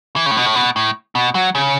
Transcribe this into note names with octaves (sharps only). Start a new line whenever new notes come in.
E3
C#3
A2
B2
A2
B2
A2
B2
F#3
C#3